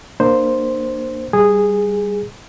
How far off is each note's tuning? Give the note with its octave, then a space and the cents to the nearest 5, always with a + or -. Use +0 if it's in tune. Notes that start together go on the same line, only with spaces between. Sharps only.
A#3 +0 D4 +35 C5 +0
G3 +0 G#4 -10